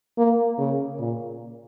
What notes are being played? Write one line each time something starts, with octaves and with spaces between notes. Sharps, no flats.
A#3
C#3
A#2